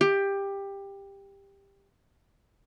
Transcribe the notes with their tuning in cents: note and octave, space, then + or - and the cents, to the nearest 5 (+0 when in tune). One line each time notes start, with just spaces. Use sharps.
G4 +15